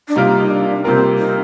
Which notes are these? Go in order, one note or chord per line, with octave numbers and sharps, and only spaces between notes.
D4
C3 G3 A#3 D#4 F4 A#4
D4
C3 G3 A#3 C4 F4 A#4
D#4